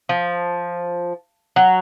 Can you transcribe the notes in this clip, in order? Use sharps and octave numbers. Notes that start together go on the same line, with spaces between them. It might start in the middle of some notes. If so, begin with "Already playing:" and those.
F3
F#3